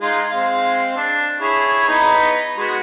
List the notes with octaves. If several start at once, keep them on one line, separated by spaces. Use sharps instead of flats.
G#3 D#4 F4
G#3 C4 F5
D4
E4 G#4 C#5
B3 D#4 B4
G#3 B3 F#4